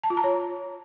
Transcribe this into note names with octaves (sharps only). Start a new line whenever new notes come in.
A5
F4
A#5
C#5